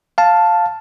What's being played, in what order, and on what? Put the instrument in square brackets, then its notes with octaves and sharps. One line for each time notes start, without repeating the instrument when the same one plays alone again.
[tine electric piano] F5 A5